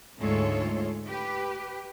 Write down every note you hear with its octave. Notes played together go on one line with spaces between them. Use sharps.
D2 G#2 G#3 F4 A4 C#5
G4 B4